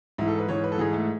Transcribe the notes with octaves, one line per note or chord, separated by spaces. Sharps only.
G#2 E3 E4
A4
B4
G#2 E3 C#5
B4
A4
G#2 E3 G#4
A3